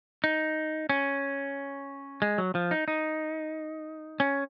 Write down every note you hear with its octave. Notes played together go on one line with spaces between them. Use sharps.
D#4
C#4
G#3
F#3
F3
D#4
D#4
C#4